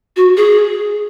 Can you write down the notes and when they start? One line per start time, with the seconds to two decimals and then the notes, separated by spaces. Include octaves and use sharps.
0.16 F#4
0.37 G#4